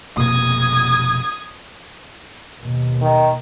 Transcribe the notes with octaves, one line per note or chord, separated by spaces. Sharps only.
F1 B2 A#3 D#6 G#6
D#2 B2
D#3